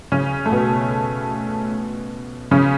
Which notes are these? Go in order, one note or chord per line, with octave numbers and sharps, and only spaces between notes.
C#3 C#4
A3
B2 B3
C#3 C#4